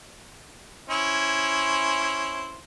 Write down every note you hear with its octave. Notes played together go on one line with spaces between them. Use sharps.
C#4 E4 C5